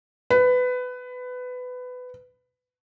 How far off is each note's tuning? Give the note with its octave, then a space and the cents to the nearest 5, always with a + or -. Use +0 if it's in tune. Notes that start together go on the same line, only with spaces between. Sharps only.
B4 +20